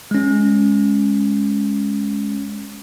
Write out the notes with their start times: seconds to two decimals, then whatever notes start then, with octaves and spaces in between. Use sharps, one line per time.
0.11 G#3 C#4